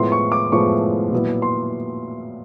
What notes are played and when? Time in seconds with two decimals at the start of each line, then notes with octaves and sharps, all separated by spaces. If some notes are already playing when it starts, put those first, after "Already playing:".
Already playing: A2 F3 G#3 B3 E4 C6
0.12 C#6
0.32 D6
0.52 A2 F3 G#3 B3 E4 C#6
1.12 A#2 F#3 B3 E4
1.42 C6